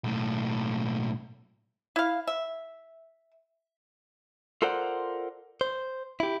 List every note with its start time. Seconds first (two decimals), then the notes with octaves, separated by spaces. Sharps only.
0.04 B1 A2
1.96 E4 F5
2.27 E5
4.62 F4 A4 A#4 C5 D5 F#5
5.61 C5
6.20 E4 G4